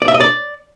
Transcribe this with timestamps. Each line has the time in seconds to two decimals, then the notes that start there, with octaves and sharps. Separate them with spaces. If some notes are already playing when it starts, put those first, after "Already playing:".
0.02 D5
0.08 E5
0.14 D#5
0.20 D5